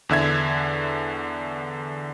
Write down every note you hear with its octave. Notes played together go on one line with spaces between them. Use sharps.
E2 D3 E5 G#6